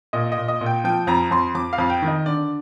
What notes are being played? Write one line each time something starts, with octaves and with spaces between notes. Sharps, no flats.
A#2 D#5
D#5
A#2
D#5
A#2
G5
F3 G5
F2 A#5
F2 C6
F2 D6
F5
F2
G5
D#3
D#5
D3 D5